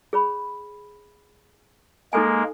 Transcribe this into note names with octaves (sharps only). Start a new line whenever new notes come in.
G#4 C#5 B5
G#3 A#3 D#4 A4 G#5